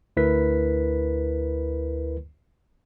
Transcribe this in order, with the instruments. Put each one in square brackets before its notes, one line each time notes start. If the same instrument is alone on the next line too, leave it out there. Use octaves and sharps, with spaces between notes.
[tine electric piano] D2 E4 A#4 B4 B6